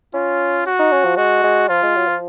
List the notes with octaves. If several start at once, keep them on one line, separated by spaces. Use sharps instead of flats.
C#4 F4
F#4
D#4
C#4
F3
G#3 F#4
G#3
F3 F4
G#3
F#3
F3